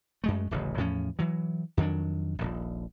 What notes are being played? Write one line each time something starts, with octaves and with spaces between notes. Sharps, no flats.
F#2 G#3 A3
D1 A1 C#3
E2 A2 F3 C#4
E3 F#3
F2 D#3 F#3 D4
D#1 A#1